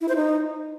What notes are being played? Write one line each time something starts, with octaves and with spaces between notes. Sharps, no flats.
E4
C5
D#4